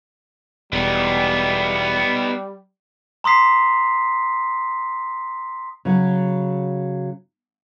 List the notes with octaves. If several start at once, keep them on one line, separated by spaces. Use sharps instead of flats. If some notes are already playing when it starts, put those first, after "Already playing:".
E1 G3 B3 D#4
A#5 C6 D#6 B6 C7
C#3 F#3